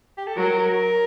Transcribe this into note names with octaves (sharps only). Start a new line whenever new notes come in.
G4
A4
F#3 A#4
A#4